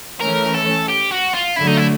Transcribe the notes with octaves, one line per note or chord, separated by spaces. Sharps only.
E3 A3 C#4 A#4
A4
G4
F#4
F4
D3 F#3 A3 E4
D#4
E4